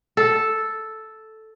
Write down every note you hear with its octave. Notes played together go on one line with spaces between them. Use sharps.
A4